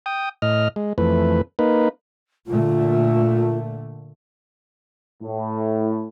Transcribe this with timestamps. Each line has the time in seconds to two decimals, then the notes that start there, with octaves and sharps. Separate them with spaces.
0.06 G5 D#6
0.42 A2 D#5 F6
0.76 G#3
0.98 F2 E3 A3 B4
1.59 A#3 D#4 B4
2.47 A#2 D3 A3 F4
5.22 A2